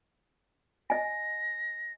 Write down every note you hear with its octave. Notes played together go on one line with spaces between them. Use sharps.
D#5 G#5 A#6